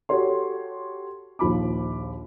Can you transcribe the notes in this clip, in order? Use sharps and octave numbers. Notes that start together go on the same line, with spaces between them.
F#4 G4 A4 C#5 C6
A#1 D#2 F3 B5 D6